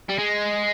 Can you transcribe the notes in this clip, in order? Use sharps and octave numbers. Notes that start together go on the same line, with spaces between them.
G3
G#3